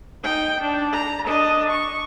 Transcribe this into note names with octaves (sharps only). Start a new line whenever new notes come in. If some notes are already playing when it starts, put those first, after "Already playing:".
D#4 G5
D4
A#5
D4 D#5
C#6